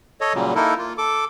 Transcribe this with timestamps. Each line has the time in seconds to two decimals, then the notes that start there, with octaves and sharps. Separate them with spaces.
0.21 A4 C#5 D#5
0.34 A#2 C#3 F#3 G3
0.55 A#3 D#4 E4 A4 A#4
0.78 A#3 F4
0.98 A4 D6